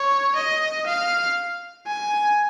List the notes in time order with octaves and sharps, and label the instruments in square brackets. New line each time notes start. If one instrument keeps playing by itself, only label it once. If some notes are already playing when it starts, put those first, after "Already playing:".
Already playing: [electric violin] C#5
D#5
F5
G#5